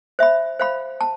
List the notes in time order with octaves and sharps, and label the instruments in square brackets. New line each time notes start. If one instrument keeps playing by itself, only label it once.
[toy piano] C5 E5 B5
C5 F5 B5
A5